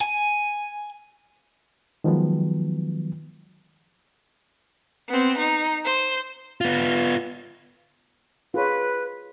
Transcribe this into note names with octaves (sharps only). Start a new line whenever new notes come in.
G#5
D#3 F3 F#3 G#3 B3
B3 C4
D#4
C5
B3 F4
F4 G#4 B4 C#5